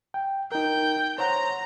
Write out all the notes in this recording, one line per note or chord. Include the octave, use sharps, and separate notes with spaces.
G5
D#4 A#4 G5
C5 C#5 F#5 A#5